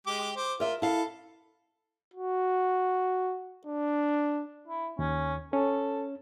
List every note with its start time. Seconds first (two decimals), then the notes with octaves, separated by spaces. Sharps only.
0.07 G#3 G4 D6
0.36 C5 D6
0.60 F4 A#4 E5
0.82 E4 A4 F5
2.14 F#4
3.67 D4
4.68 E4
4.99 D#2 C#4
5.53 C#4 A4